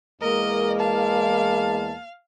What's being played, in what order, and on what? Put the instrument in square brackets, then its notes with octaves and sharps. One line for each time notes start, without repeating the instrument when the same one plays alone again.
[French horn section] E2 G#3 [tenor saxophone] A#3 [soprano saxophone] A#4 [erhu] D#5
[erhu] F5 [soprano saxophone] A5